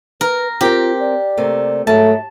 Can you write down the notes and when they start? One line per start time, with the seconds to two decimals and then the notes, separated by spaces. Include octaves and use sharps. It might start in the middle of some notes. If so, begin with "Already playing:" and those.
0.21 A#4 B4
0.61 C4 F4 G4 A#4 G5
1.00 D5
1.37 C3 A3 A#3
1.87 G#2 F#3 A3 E5 A5